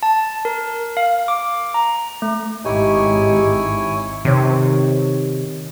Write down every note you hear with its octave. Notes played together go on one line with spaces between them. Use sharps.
A5
A#4
F5
D6
A#5
A3
G#1 D#4 E4 G4 C#5 G#5
C3 D#3 C#5